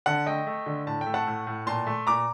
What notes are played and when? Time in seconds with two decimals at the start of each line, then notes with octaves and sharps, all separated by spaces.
0.06 D3 F#5 A5
0.27 A3 D#5 G5
0.47 A3
0.66 D3
0.86 A2 A5
1.01 A3 G5
1.14 F#5 A5
1.27 A2
1.47 A2
1.66 A#2 A5 C6
1.87 A3
2.07 A#2 A#5 D6